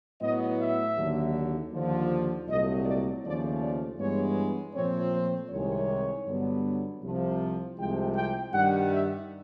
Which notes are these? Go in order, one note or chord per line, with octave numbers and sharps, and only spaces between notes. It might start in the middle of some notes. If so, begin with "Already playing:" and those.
A2 F#3 B3 D#5
E5
D#2 D3 F#3
D#2 D3 F3
C2 A#2 F#3 A3 D#5
D5
D#2 C#3 F3 A3 D5
D5
G2 E3 G#3 B3 C#5
A#2 F3 A3 C4 C#5
C5
C2 C3 D#3 G#3 C#5
G2 D3 F#3 B3
C2 C3 F3
C2 C3 F3 G#3 G5
G5
G2 D#3 G3 F#5
E5